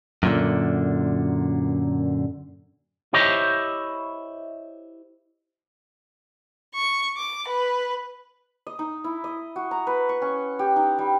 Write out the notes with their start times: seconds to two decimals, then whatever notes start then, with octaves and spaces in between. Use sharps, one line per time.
0.23 F#2 A#2 D3
3.13 E4 G4 C5 C#5 D#5 E5
6.75 C#6
7.18 D6
7.49 B4
8.67 D#5
8.79 D#4
9.04 E4
9.24 D#5
9.56 F#4
9.71 A#5
9.87 B4
10.09 C#6
10.22 C#4
10.59 G4
10.76 D#4
10.99 G3